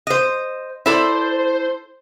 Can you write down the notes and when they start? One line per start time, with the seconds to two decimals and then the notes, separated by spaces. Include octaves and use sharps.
0.07 C5 D#5
0.86 E4 A4 C5 D5